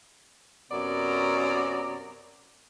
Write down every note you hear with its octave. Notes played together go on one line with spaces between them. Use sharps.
F#2 C3 B3 D5 A#5